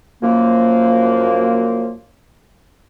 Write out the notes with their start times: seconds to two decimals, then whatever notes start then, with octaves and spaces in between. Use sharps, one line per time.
0.22 F#2 F3 A#3